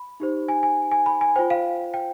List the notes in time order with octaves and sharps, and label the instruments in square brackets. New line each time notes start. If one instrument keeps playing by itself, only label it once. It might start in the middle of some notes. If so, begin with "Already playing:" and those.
Already playing: [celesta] B5
D#4 G4 C5
G#5
G#5
G#5
B5
G#5
F4 C5 G5
F5
G5